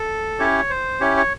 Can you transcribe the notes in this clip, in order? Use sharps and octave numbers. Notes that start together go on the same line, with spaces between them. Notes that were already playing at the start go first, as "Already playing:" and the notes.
Already playing: A4
C#4 E4 G4 C#5
C5
C#4 E4 G4 C#5
C#5